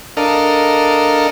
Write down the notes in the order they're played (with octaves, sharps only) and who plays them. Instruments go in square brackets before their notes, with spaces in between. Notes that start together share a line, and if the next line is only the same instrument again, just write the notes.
[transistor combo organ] D4 A4 A#4 D#5 F5